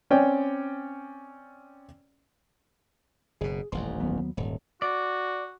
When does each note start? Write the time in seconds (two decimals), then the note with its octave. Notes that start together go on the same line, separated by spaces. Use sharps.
0.10 C4 C#4 C#5 D5 G5
3.41 F#1 B2 G#4
3.72 D#1 A1 F2 C6
4.00 D#2 F#3 B3
4.37 D#1 G#2
4.82 F#4 D5